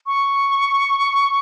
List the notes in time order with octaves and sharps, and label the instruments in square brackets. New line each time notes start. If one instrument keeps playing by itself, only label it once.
[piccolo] C#6